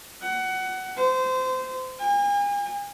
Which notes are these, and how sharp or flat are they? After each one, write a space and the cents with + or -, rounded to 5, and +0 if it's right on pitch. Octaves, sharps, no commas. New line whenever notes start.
F#5 +20
C5 -25
G#5 -40